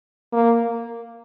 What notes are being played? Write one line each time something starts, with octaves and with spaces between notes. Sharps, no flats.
A#3